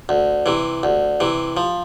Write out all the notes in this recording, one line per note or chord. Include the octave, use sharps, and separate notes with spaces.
D2
C3 E3
D2
C3 E3
F3